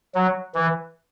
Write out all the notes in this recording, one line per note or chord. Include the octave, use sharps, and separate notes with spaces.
F#3
E3